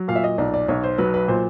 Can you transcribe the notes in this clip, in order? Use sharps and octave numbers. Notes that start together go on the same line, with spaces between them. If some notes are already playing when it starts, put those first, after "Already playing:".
Already playing: F#3
A#2 F5
E5
D#5
B1 D5
D5
B1 C#5
C5
F#3 B4
B4
A#2 C5